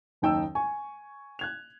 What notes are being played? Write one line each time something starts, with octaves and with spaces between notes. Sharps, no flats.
F#1 D#2 D#4 G5 A5 E6
G#5 C#6
F#6 G#6 F7